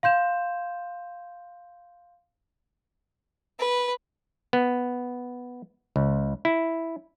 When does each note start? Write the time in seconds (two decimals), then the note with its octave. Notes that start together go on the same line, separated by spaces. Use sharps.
0.03 F5 C6 G6 E7
3.58 B4
4.53 B3
5.96 C#2
6.45 E4